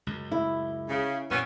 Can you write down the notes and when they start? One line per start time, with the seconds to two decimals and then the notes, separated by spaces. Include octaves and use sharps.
0.07 C#2 F#2
0.32 E4
0.88 C#3
1.30 F#2 A#2 E3 B3 C#4